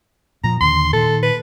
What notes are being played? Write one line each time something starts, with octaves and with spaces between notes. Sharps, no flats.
A#2 F3 A#5
D#2 D3 C6
A#2 D#3 A4
B4